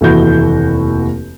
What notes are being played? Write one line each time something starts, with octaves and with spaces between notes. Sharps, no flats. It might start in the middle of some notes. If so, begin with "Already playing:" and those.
F1 D#2 E3 E4 F#4 G6